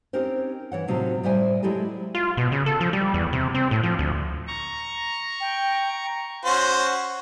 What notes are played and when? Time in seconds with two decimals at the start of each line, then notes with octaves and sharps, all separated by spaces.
0.13 C4 C#4 D#4 G4 A#4 C5
0.72 E3 C#5 F#5
0.88 A2 C3 F#3 D#4 F4 A4
1.23 A2 G3 C5 D5 E5 G#5
1.63 F#3 G#3 E4 G4 A4 G#5
2.15 F4
2.37 B2
2.52 C#3
2.66 A4
2.81 F3
2.93 G3
3.14 E2
3.33 C3
3.55 C4
3.71 A2
3.83 F3
3.99 D2
4.47 A#5 C#6
5.40 G5
6.45 C#4 F#4 C5